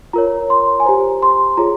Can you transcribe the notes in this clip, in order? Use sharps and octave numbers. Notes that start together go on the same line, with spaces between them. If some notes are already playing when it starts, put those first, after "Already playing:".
F4 A#4 C#5 A#5
C6
G#5
G4 C5 A#5
C6
F4 G#4 C#5 A#5